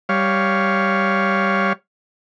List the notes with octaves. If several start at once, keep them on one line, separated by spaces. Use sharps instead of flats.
G3 C#5 F5